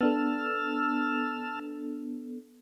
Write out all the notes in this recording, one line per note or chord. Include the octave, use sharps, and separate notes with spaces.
B3 D4 A4 A5 E6 F6